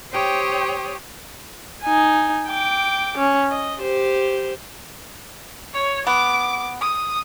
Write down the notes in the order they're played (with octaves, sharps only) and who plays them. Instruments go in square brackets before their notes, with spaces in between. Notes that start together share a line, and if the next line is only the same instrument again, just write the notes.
[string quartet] G4 C5 C#5 G5 D#6
[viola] D#4 G#5
G5 D6
C#4
D#5
G4 C5
[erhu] C#5
[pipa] B3 [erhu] D6
[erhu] D#6